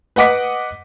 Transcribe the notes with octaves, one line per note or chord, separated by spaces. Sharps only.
B4 D#5 F#5 D6 B6